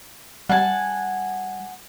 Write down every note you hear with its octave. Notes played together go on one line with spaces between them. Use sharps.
G3 F#5 G#5 A5